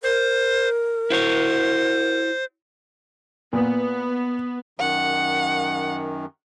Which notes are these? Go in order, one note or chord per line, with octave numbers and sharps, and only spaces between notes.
A#4 C5
E4 F#4 C5 C#5
A#2 B3
F#2 D#3 F#5